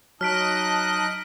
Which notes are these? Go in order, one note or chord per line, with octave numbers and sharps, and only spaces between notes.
F#3 D#4 D#5 A5 F6 F#6 B6 D7